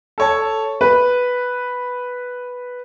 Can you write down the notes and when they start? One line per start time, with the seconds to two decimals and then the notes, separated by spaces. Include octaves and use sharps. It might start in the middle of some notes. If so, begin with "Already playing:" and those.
0.18 A4 C#5 A5
0.81 B4